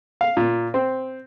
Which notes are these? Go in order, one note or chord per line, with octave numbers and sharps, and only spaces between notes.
F5
A#2
C4